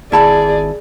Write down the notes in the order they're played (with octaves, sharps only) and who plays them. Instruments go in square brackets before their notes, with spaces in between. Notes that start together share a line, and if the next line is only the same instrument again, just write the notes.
[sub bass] G#1 [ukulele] E4 A5 B5 [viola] G#4 D5